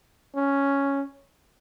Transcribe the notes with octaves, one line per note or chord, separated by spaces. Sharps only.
C#4